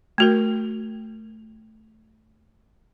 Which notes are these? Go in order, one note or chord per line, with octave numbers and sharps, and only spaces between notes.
A3 F#4 A#4